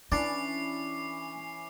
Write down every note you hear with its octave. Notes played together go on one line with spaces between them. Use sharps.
E3 C#4 D4 E4 D5 D6 C7